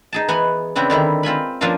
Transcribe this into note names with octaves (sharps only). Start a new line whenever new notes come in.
D#4 G#4 A5
E3 B3 F#5 G#5
C#3 B3 C4 D4 E4
D3 D#3 G3 E4
C4 F4 G#5 B5
F3 A#3 C#4 D4 F4 A#4